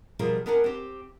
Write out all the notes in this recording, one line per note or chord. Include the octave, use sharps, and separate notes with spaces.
B2 F3 G3 F4 G#4 A#4
B3 D4 A#4 F#5 G#5
C4 G4